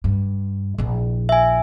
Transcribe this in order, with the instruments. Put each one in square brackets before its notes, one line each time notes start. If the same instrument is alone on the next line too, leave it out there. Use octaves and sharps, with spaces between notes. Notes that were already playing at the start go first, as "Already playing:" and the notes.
[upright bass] G2
A#1 E4
[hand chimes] E5 G#5